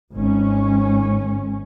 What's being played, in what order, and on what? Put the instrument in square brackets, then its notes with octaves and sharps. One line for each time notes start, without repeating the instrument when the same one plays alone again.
[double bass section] G#1 C#4